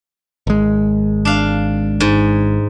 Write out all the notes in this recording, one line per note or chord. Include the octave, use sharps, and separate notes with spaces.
G#1 G#3
D4 F5
G#2